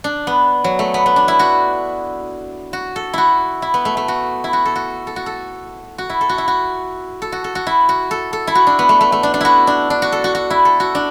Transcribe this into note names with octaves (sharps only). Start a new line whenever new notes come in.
D4
B3
F#3
A3
B3
B3
D4
E4
F#4
F#4
A4
E4 F#4
E4
B3
A3
A3
F#4
E4
F#4
A4
F#4
A4
F#4
A4
F#4
E4
A4
F#4
E4
F#4
A4
F#4
A4
F#4
E4
F#4
A4
A4
E4
F#4
D4
B3
A3
A3
A3
D4
D4
E4 F#4
D4
D4
F#4
A4
F#4
F#4
E4
A4
F#4
D4